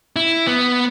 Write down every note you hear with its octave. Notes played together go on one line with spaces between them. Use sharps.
E4
B3